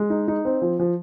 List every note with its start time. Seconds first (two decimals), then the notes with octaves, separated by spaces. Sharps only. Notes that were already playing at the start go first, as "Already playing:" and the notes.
Already playing: G#3
0.10 D#4
0.28 D#4
0.45 C4
0.62 F3
0.79 F3